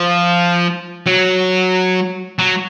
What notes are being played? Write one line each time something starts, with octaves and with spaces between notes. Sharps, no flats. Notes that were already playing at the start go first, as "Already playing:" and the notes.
Already playing: F3
F#3
F#3